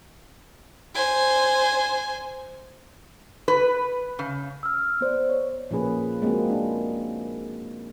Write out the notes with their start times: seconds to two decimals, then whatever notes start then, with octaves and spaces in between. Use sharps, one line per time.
0.94 C5 G#5
3.48 B4
4.19 C#3
4.63 E6 F6
5.01 B3 C5 D5
5.29 C#5
5.71 A#2 F3 A#3 C#4 G#4 B4
6.22 G#3 A#3 C4 F#4 G#4
6.50 D4